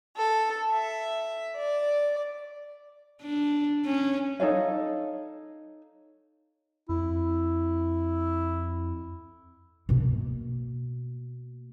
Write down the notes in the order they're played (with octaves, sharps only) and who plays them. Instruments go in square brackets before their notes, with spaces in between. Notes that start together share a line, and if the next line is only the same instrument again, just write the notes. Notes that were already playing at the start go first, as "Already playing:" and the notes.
[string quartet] A4
E5
D5
[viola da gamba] D4
C#4
[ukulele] D#4 A4 C#5 F5
[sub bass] F2 [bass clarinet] E4
[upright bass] B2 A#3